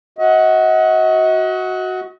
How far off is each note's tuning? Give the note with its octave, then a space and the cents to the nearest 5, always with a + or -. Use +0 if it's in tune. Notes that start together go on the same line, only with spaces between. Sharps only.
F#4 +0 D#5 +40